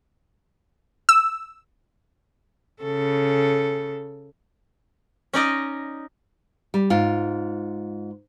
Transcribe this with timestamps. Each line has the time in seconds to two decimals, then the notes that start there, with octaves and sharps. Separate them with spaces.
1.09 E6
2.82 C#3 A4
5.33 C#4 D#4 D5 D#5
6.74 G3
6.90 G#2 F4